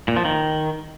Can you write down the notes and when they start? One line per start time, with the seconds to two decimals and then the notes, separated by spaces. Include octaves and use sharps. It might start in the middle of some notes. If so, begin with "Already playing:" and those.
0.08 A#2
0.16 F3
0.25 D#3